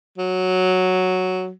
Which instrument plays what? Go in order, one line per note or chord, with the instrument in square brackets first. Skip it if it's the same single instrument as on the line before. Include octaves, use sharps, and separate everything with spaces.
[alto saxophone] F#3